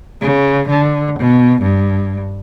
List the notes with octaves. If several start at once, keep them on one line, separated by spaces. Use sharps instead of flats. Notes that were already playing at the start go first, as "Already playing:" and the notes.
C#3
D3
B2
G2